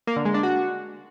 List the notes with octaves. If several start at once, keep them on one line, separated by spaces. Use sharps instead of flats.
A#3
D3
G#3
D4
F#4